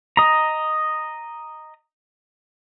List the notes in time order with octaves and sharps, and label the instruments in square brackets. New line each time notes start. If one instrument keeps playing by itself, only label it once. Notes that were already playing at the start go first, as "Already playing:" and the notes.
[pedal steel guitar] D#5 A#5